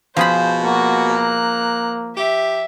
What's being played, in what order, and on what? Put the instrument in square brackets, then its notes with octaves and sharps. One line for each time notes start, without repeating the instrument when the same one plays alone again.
[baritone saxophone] B2 [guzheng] F3 G#4 B5 [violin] C5
[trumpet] A#3 [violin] F#4
[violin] A#5 F#6
[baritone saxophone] G4 [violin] E5